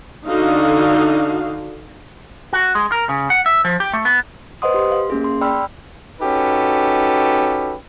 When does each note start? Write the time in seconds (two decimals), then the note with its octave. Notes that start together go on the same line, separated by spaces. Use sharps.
0.27 D3 D#4 F#4 F5
2.53 F#4
2.75 G#3
2.92 A#4
3.09 C#3
3.30 F#5
3.46 E5
3.65 F3
3.80 G4
3.93 A3
4.05 B3
4.62 B4 C5 D#5 F#5 C6 D#6
4.74 G4 C6
4.92 F5
5.10 A#3 C#4 G#4
5.24 C6
5.41 D5 G5 B5 E6 F6
6.21 C#4 D#4 F#4 G4 A4 B4